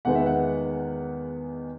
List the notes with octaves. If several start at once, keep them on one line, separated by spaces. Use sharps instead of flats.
E2 D#3 G#3 B3 F#5
E5
F#5